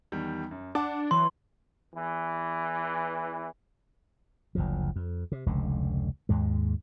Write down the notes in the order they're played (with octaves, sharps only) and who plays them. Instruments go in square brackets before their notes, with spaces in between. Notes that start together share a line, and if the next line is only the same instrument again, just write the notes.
[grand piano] E2 D#3 G3
F#2
[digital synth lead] D4 [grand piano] F#5 A5 D6
[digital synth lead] E3 [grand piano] F#3 [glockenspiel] C6
[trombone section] E2 E3
[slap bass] F#1 D2 F3
F2
C3
F1 C#2 D3
D#2 G#2 G#3